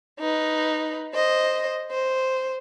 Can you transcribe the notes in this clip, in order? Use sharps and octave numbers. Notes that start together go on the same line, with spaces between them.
D#4 B4
C5 D#5
C5